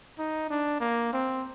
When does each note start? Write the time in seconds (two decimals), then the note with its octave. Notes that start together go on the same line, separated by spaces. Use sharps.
0.19 D#4
0.50 D4
0.80 A#3
1.13 C4